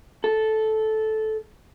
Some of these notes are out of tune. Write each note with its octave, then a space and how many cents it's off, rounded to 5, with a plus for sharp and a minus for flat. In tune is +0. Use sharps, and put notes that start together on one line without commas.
A4 -10